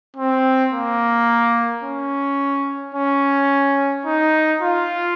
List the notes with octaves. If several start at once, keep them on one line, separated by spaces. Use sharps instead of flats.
C4
A#3
C#4
C#4
D#4
F4